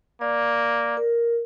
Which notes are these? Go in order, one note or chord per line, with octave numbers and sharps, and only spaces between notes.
A#3 D5
A#4